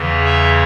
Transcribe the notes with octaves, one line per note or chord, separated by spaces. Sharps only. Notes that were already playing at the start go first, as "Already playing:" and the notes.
Already playing: E2 C#3 E3
E5